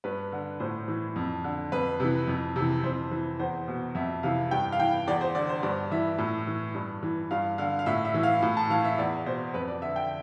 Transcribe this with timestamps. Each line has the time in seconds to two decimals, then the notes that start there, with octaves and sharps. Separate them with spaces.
0.04 G2 B4
0.32 D3
0.60 A2 C5
0.88 E3
1.16 F2
1.44 D3
1.72 F2 B4
2.00 C3 E3
2.28 F2
2.56 C3 E3
2.83 F2 C5
3.11 E3
3.39 E2 C5
3.68 B2
3.95 F2 E5
4.23 C3 E3 F5
4.51 G2 G5
4.72 F5
4.79 E3 G5
5.07 E2 D5
5.21 C5
5.35 D3 D5
5.49 C5
5.63 G2 D5
5.91 E3 E5
6.19 A2
6.47 E3
6.75 G2
7.03 E3
7.31 G2 F5
7.58 D3 F5
7.79 F5
7.86 A2 E5
8.05 E5
8.14 E3
8.23 F5
8.43 A2
8.57 A5
8.70 E3 F5
8.84 E5
8.98 E2 D5
9.26 B2 C5
9.54 F2 B4
9.68 D5
9.82 D3 E5
9.96 G5